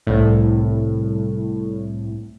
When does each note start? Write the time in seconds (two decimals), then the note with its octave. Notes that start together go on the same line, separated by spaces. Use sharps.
0.07 C2 A2